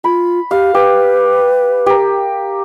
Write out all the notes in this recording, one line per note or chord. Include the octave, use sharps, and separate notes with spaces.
F4 B5
G4 F5
G4 B4
G4 A#4